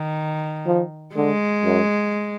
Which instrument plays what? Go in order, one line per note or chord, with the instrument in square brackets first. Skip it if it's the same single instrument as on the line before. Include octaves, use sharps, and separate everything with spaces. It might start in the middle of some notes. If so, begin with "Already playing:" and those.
Already playing: [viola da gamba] D#3
[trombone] F3
[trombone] D3 [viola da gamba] G#3
[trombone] F#2